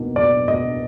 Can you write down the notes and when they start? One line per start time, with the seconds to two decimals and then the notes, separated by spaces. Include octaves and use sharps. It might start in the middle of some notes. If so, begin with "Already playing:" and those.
Already playing: B2 A#3 D#4
0.16 B2 D5
0.48 B2 D#5